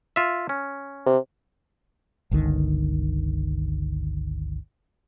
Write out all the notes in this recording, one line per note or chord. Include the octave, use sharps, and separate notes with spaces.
F4 E5
C#4
C3
G1 C#2 D3 D#3